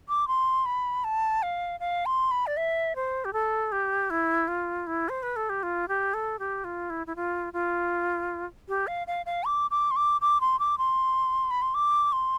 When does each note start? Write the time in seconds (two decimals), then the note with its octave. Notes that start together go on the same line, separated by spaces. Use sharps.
0.09 D6
0.28 C6
0.66 B5
1.04 A5
1.43 F5
1.80 F5
2.06 C6
2.31 B5
2.47 D5
2.57 E5
2.96 C5
3.25 G4
3.33 A4
3.72 G4
4.10 E4
4.48 F4
4.87 E4
5.09 C5
5.23 B4
5.36 A4
5.50 G4
5.63 F4
5.88 G4
6.14 A4
6.39 G4
6.64 F4
6.90 E4
7.07 E4
7.16 F4
7.53 F4
8.69 G4
8.87 F5
9.07 F5
9.26 F5
9.44 D6
9.71 D6
9.91 C6
9.96 D6
10.21 D6
10.41 C6
10.59 D6
10.78 C6
11.51 B5
11.62 C6
11.74 D6
12.12 C6